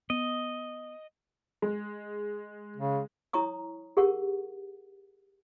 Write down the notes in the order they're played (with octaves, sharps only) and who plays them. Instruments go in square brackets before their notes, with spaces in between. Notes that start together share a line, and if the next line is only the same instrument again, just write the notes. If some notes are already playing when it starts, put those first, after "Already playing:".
[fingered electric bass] B3 [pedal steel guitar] D#5
[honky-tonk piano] G#3
[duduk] C#3
[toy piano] E4 C#5 A#5 C#6 D#6
G4 G#4 A#4 F#5 C#6